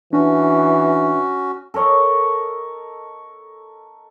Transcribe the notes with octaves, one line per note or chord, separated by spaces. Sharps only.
E3 C#4 D4 F#4
A4 A#4 C#5 D#5